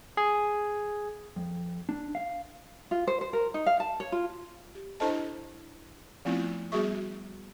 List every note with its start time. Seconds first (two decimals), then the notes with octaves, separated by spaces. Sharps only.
0.17 G#4
1.36 F2
1.89 D4
2.15 F5
2.91 F4
3.07 C5
3.21 C5
3.33 A#4
3.54 D#4
3.66 F5
3.80 A5
4.00 C#5
4.12 F4
4.75 G4
5.00 D4 E4 A4 C5 D#5 A5
6.25 F3 A3 B3 C4 E4 F4
6.72 G3 B3 F#4 G#4 E5 C#6